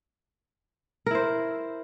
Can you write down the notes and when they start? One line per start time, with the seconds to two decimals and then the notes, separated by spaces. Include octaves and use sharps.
1.06 A#4
1.11 E4
1.15 C5